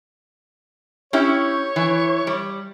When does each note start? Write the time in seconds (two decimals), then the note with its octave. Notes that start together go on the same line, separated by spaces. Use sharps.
1.13 C#4 E4 G4 C#5
1.76 E3
2.27 G3